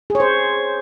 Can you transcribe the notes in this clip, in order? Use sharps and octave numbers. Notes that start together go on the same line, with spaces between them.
G#4
C#5
C5